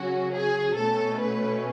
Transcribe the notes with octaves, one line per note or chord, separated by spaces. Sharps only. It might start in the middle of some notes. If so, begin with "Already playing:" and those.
Already playing: C#3 F#3 C#4 F#4
G#4
B2 A3 C#4 A4
B4